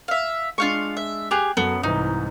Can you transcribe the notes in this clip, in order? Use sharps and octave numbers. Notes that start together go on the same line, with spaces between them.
E5 F5
G#3 D4 F4 F5 C#6
E5
G4 G#4 G5 F#6 F7
F#2 F#3 B3 A4
C2 G#2 E3 D#4